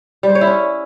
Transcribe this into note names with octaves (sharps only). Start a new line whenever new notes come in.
G3
C5
C#5
E4
C#4